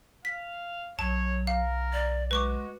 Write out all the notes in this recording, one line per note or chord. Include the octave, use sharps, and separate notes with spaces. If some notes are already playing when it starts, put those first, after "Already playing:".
F5 B6
B1 F#3 C#5 A5
A#4 F5
D5
G#3 F#4 B4 C#6 D6